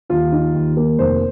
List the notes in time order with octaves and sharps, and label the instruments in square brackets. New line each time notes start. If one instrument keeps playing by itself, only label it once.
[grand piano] D#2 F4
D#4
D#2
A#3
F1 C5